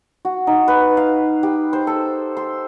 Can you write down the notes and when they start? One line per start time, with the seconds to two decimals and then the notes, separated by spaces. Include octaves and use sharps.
0.25 F#4
0.47 D#4
0.68 B4
0.97 F5
1.43 G4
1.73 C5
1.87 A4
2.37 C6